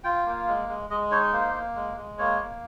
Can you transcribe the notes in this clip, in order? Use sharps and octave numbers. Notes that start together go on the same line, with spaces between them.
F4 G5
A#3
G#3
G#3
G#3 D#5
D#4 C#5
A#3 C5
A#3
G#3
G#3
A#3 C#5
A#3